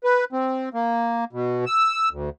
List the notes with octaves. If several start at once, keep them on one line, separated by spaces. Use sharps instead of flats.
B4
C4
A#3
B2
E6
D2